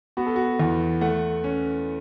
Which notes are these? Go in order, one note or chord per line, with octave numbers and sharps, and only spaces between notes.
B3 F#4
A4
F#4
E2
A3 F#5
C#4